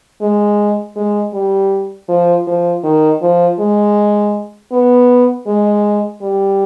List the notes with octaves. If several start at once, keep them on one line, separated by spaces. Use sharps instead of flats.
G#3
G#3
G3
F3
F3
D#3
F3
G#3
B3
G#3
G3